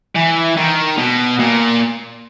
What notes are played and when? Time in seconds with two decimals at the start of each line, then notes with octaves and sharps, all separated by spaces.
0.16 E3
0.57 D#3
0.97 B2
1.39 A#2